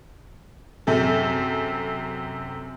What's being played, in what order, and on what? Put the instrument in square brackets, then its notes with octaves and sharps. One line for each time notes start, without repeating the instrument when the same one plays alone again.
[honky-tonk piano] F#2 C3 G#4 A4